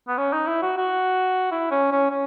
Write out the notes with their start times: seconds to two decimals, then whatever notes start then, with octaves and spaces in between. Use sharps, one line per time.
0.08 B3
0.18 C#4
0.33 D#4
0.47 E4
0.62 F#4
0.78 F#4
1.51 E4
1.71 C#4
1.91 C#4
2.11 C#4